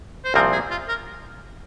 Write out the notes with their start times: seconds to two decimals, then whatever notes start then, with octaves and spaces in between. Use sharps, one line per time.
0.24 C5
0.34 C2 A#2 F3 C4 A#4
0.52 G#4
0.70 F4
0.88 A#4